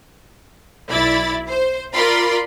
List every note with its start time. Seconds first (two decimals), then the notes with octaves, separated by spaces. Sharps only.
0.89 B1 E4 D5 B5 A6
1.49 C5
1.95 F4 A#4 D5 B5 C6